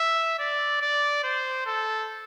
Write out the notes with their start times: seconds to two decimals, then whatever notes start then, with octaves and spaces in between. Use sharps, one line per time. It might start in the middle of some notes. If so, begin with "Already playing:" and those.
Already playing: E5
0.39 D5
0.81 D5
1.23 C5
1.66 A4